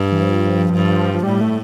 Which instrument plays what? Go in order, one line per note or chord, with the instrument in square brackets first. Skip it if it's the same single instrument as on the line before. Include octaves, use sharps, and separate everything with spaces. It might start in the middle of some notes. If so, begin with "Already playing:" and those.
Already playing: [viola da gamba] G2
[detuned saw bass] E3
F3
[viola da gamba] G2
[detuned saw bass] F3
[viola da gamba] A2 [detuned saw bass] G3
[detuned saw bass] A3